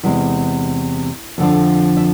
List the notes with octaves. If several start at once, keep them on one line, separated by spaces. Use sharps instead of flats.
E2 C3 G#3 E4
F2 D3 F3
E5